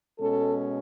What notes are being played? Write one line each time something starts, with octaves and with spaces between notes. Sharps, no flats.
B2 G#3 C#4 A4